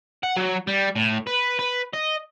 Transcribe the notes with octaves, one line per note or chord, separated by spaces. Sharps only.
F#5
F#3
G3
A2
B4
B4
D#5